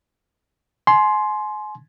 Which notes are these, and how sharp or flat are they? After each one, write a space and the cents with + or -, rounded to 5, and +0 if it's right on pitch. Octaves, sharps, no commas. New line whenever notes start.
G#5 +35 C6 +0